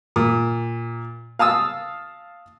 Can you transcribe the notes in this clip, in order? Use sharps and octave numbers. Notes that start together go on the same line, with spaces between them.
A#2
F5 A5 D#6 E6